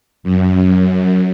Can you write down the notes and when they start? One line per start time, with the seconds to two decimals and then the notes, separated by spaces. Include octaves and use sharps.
0.23 F#2